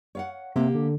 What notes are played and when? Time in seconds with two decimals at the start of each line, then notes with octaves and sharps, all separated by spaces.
0.15 C#5 F5 F#5
0.56 C3 A#3 G4
0.75 D3